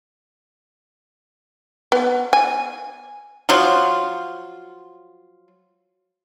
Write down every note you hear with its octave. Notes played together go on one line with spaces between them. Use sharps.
B3
G#5
F3 F#3 F4